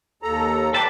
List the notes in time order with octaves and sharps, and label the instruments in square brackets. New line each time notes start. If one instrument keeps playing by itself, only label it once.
[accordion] D#2 A4 A#5
[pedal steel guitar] B4 A5 [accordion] D5 G5 C6